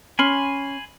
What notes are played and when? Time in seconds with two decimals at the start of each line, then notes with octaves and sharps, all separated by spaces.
0.19 C#4 G#5 B5 C6